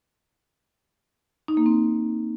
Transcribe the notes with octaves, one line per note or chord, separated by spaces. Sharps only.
D#4
A#3
C4